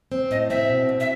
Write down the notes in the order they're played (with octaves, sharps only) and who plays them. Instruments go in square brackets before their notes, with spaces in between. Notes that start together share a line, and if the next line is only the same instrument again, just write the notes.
[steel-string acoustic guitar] C4
[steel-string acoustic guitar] A2 [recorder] D#5
[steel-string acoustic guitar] C4 [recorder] E5
[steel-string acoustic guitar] B2
B2
[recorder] E5